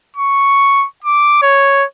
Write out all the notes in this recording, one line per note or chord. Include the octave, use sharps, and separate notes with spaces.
C#6
D6
C#5